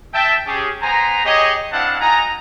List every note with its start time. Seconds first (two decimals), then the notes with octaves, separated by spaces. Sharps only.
0.13 E5 G5 A5
0.47 C#4 G4 G#4
0.82 B3 C5 G#5 A#5
1.25 G4 G#4 C#5 D#5
1.71 C4 D4 E4 F5 F#5 A5
2.00 D#4 F#4 G#5 A#5